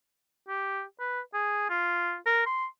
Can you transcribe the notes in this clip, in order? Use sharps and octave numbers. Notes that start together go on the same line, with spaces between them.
G4
B4
G#4
F4
A#4
C6